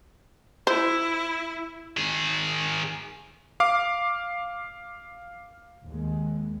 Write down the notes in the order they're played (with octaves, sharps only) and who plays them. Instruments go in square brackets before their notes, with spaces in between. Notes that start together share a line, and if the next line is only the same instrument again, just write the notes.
[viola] E4 [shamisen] C5
[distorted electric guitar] D#3 G#4
[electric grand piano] F5 D6
[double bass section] D#2 G#3